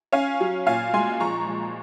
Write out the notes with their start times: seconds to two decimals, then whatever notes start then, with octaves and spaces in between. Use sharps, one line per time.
0.13 C#4 F5 G#5
0.40 F#3
0.66 A#2 F5 G#5
0.93 G#3 G#5 C6
1.20 F3 A#5 C#6
1.47 F3